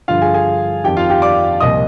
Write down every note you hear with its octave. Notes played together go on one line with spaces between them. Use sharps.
G2 D3 F3 F4 F5
G#4 G#5
G#4 G#5
F2 D#3 G4 G5
F4 F5
G4 G5
D5 D6
C2 A#2 F3 D#5 D#6